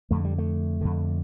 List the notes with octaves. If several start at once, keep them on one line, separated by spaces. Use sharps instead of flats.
F2 D3 A3
G3
A3
F2 D3